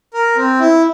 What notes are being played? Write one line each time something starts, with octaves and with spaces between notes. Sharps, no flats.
A#4
C4
E4